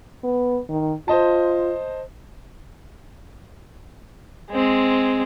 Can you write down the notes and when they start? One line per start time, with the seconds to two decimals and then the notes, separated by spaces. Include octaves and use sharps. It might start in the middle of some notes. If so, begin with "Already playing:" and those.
0.24 B3
0.69 D#3
1.08 F4 C5 D#5 A5
4.51 G#3 C4